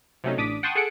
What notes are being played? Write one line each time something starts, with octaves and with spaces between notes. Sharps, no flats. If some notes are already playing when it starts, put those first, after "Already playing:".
C3 F#3 A3 C#4 D#4
A1 D4 D6 D#6 B6
F#5 G5 A5 C6 C#6 D#6
G#4 A4 F#5 C#7 D7